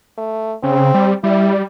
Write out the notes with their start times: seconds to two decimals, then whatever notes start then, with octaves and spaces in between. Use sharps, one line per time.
0.18 A3
0.63 C#3 C4
0.94 G3
1.24 G3 E4